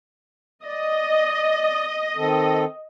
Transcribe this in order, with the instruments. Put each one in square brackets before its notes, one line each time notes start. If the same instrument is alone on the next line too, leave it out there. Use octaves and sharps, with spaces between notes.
[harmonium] D5 [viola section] D#5
[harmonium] D#3 C4 A4